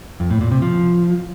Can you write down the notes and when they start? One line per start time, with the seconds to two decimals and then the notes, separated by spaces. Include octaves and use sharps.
0.20 F2
0.30 A2
0.41 A#2
0.52 C3
0.62 F3